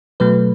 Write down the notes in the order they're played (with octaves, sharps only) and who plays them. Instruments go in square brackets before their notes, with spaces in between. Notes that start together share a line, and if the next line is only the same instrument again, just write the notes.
[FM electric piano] B2 F#3 A3 B4